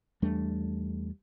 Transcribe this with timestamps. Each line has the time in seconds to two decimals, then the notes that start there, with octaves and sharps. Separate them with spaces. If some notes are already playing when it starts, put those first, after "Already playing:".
0.22 E2 G3 A3 D4